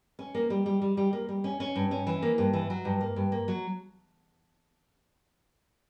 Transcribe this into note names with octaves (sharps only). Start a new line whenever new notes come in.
C#4
A#3
G3
G3
G3
G3
A#3
G3
C#4
C#4
G2
C#4
E3
A#3
G2
E3
F#3
G2
A#3
G2
A#3
F#3